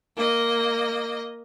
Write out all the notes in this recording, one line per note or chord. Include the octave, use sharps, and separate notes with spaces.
A#3 D#5